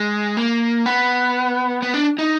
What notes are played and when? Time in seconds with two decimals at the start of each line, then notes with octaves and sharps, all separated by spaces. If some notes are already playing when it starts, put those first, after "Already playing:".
Already playing: G#3
0.37 A#3
0.86 B3
1.82 B3
1.94 D4
2.18 D#4